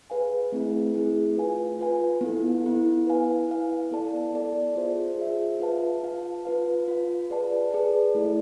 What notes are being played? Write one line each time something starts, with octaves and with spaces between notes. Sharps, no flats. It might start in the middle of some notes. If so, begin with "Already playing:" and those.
G#4 B4 F5 G#5
A3 C4 E4 G#4
A3 C4 E4 G#4
F4 B4 F5 G#5
F4 B4 F5 G#5
B3 E4 A4
B3 E4 A4
E4 B4 F5 G#5
E4 B4 F5 G#5
B3 E4 A4 D5 A5
B3 E4 A4 D5 A5
F4 G#4 C5 E5
F4 G#4 C5 E5
F4 B4 F5 A5
F4 B4 F5 A5
F4 B4 F5
F4 B4 F5
G#4 B4 D5 A5
G#4 B4 D5 A5
A3 E4 A4 D5